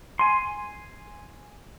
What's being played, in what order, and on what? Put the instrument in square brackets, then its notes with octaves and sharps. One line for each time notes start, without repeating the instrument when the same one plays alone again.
[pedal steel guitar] G#5 C6